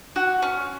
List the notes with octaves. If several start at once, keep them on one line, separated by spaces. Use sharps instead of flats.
F#4
C#4